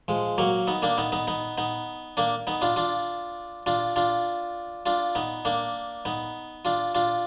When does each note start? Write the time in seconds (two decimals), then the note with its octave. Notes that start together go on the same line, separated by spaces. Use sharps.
0.08 F3 G#3
0.38 F#3 A#3
0.67 B3 D#4
0.82 A#3 D4
0.98 B3 D#4
1.12 B3 D#4
1.28 B3 D#4
1.58 B3 D#4
2.17 A#3 D4
2.47 B3 D#4
2.62 D4 F4
2.76 D4 F4
3.66 D4 F4
3.96 D4 F4
4.86 D4 F4
5.15 B3 D#4
5.45 A#3 D4
6.05 B3 D#4
6.65 D4 F4
6.95 D4 F4